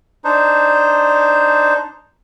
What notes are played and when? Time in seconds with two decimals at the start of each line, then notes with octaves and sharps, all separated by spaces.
0.24 D4 D#4 C5